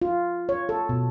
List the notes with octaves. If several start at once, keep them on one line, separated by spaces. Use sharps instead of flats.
F4
C#5
A4
B2